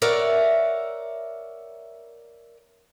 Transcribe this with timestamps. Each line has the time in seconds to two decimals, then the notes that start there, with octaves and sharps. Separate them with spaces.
0.02 A#4 C#5 D5 E5 F#5